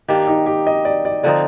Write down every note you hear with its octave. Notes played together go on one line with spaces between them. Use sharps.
D#3 A#3 D4 G4
D#4
G4
D#5
D5
D5
D3 F3 C4 D#4 D5